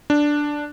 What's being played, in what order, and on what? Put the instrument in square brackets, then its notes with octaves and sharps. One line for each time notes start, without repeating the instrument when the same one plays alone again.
[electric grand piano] D4